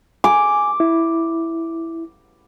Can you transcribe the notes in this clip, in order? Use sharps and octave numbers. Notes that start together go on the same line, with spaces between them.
G#5 D6
E4